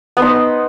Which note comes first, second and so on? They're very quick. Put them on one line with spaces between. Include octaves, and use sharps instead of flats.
B3 C5 D#4